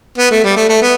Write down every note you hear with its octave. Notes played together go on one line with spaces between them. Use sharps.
B3
A3
G3
A3
A3
B3